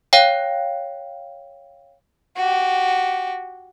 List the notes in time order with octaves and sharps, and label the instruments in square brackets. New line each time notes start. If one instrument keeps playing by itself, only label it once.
[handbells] C#5 F5 G5
[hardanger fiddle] F#4 G4